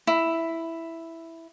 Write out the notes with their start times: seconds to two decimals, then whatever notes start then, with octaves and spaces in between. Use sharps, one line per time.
0.07 E4